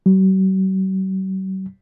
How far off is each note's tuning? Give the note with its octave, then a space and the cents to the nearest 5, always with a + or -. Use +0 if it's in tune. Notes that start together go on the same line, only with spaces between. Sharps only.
F#3 +45